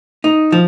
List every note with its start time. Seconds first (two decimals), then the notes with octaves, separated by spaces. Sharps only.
0.24 D#4
0.52 F3